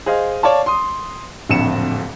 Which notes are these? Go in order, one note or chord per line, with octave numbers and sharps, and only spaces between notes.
G#4 C5 D#5 F5
C#5 D5 F5 A5
C6 D#6
D1 A#1 F2 C#7 E7